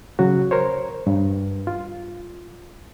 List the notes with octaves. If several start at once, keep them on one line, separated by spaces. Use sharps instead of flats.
C#3 F#3 F#4
A#4 C5 C#5
G2
F4